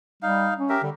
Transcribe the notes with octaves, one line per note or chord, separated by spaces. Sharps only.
G3 D#4 F5
C#4
G4 A#4 E5
D3 G3